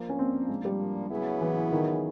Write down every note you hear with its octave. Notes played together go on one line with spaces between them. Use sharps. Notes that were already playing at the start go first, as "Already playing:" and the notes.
Already playing: F3 A#3 D4
C#4
C4
G#3
G3
C#3 F#3 B3 E4 G#4
E3
D#3